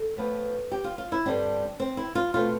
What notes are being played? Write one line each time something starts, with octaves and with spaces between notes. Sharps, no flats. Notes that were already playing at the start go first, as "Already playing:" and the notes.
Already playing: A4
A2 F3 B3
G4
F4
F4
E4
G2 D3 G3 C4 D4
C4
E4
F4
B2 A3 C4 F4